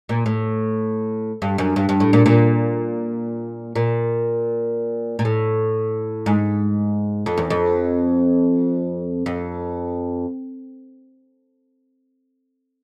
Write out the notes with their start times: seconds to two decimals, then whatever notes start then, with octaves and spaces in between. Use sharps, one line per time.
0.09 A#2
0.26 A2
1.42 G2
1.58 F#2
1.76 G2
1.89 G2
2.00 A2
2.13 A#2
2.26 A#2
3.75 A#2
5.19 A#2
5.25 A2
6.26 G#2
7.26 F2
7.37 E2
7.50 F2
9.26 F2